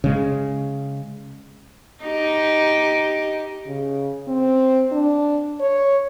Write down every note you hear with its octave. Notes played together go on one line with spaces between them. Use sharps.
C#3 G#3
D#4 G4
C#3
C4
D4
C#5